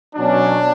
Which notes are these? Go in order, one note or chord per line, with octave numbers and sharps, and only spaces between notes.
B2 F#3 C#4 D4